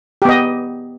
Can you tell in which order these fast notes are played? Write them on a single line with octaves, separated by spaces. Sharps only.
G4 B3 D#5